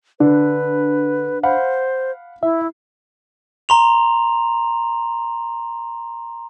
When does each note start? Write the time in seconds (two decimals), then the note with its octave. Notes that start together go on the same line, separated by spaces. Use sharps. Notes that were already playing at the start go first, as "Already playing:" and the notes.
0.20 D3 D4 B4
1.43 C5 F5 F#5 B5
2.43 E4 E5
3.69 A#5 C6 F7